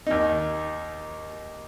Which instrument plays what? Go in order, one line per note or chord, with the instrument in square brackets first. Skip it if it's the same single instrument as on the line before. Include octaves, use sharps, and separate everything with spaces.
[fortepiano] D#2 D#4